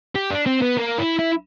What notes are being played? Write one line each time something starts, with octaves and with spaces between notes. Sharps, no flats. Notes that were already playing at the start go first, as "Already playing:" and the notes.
G4
D4
C4
B3
A#3
E4
E4